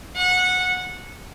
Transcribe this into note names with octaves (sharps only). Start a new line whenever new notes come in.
F#5